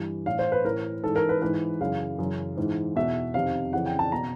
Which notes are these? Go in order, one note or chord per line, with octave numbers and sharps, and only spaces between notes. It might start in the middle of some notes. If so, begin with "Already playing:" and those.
Already playing: G2 E3
A2 E3 F5
C5
B4
A2 E3 A#4
G#2 E3 A4
A#4
B4
G#2 E3 B4
F#2 C#3 E3 F5
F#2 C#3 E3
G#2 E3
E2 B2 E5
F2 C3 D#3 F5
F2 C#3 E3 F#5
G5
A5
B2 A#5